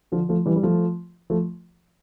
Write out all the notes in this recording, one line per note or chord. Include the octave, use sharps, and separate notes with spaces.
D3 F3
F3 A3
E3 G3
G3
F3 A3
F3 A3